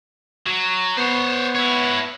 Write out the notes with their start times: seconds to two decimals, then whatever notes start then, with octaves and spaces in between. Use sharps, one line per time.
0.47 F#3
0.98 B3 C5 C#5
1.55 E4 C#5